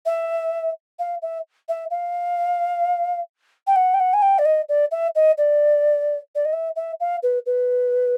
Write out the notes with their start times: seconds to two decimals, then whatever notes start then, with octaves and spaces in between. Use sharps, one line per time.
0.05 E5
0.99 F5
1.22 E5
1.68 E5
1.90 F5
3.67 G5
3.75 F#5
3.93 G5
3.99 F#5
4.13 G#5
4.22 G5
4.38 D5
4.45 D#5
4.68 D5
4.91 E5
5.15 D#5
5.37 D5
6.35 D5
6.45 D#5
6.52 E5
6.75 E5
7.00 F5
7.22 B4
7.46 B4